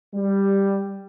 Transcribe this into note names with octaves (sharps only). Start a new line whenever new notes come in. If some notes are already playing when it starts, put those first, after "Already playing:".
G3